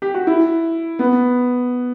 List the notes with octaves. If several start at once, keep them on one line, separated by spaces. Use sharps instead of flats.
G4
F#4
E4
B3